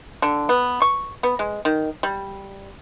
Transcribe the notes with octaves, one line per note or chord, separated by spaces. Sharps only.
D3
B3
C#6
B3
G#3
D#3
G3